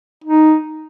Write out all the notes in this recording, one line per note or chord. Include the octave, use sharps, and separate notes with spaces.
D#4